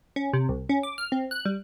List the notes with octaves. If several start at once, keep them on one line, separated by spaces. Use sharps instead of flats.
C#4
C3
C2
C#4
D6
F6
C4
F#6
G3